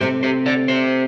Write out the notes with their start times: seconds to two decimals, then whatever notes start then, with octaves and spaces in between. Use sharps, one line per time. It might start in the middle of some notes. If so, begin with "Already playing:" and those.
0.01 C3 A3 C4 G4 C5
0.23 G4 C5
0.46 A4 D5
0.68 G4 C5